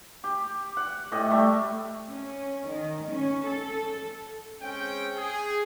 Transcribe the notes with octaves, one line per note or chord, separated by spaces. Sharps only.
G4
F#5
A2 G4 D#5
G3 A3 E5
C#4
D#3
C#4
A4
G#3 C4 C#4 G#4 G5
G#4